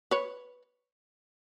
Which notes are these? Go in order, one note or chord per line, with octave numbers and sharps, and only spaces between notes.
B4 C#5